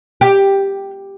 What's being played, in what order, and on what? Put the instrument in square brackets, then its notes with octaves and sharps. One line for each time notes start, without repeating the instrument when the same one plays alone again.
[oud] G4